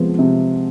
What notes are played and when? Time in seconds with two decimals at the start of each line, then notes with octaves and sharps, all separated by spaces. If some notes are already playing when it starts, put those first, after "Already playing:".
Already playing: C3 F3 G#3 B3
0.19 C3